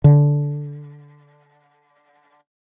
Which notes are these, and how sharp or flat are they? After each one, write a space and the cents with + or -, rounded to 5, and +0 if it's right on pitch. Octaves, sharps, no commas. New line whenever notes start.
D3 -10